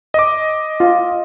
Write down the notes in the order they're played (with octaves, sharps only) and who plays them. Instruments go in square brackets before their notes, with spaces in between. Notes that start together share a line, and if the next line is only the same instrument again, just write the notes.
[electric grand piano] D#5 D6
[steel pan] F4